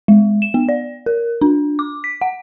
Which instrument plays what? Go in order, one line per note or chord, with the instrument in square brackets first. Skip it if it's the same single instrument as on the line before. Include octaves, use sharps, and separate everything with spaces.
[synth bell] G#3
E7
B3
D5
A#4
D4
D6
B6
F#5